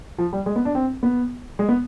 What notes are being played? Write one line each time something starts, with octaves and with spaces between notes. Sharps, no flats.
F3
G3
G#3
B3
D4
C4
B3
G#3
B3